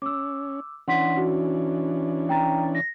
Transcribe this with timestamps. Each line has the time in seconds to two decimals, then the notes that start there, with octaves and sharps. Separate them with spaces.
0.02 C#4 D6 E6
0.88 E3 C#4 D4 F#5 C6 B6
1.17 F#4
2.29 G5 A#5 A6
2.75 A#6